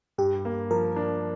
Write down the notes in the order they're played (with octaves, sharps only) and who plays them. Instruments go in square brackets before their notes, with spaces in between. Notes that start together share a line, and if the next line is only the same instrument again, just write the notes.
[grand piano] G2 [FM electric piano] G4
[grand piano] A#3
[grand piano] F3 [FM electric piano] A#4
[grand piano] D4